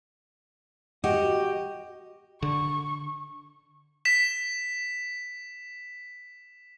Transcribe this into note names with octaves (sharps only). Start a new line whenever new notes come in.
F#4 G4 D#5
D3 C#6
B6 E7